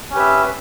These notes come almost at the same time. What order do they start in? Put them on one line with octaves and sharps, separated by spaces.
C#4 G4 B4 E5